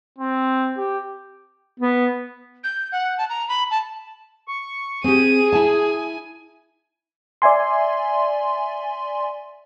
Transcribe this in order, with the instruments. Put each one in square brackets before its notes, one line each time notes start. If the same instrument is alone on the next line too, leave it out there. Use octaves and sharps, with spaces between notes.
[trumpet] C4
G4
[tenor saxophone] B3
[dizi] G6
F#5
A5
A#5
B5
A5
[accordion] C#6
[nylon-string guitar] C4 G4 [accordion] G#4 [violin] D#7
[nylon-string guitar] E4 A5 [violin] G#5
[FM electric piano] D5 E5 G#5 C6